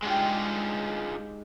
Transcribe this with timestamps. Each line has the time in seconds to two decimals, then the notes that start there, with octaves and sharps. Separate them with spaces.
0.03 G#2 G#3 D4 F4 G4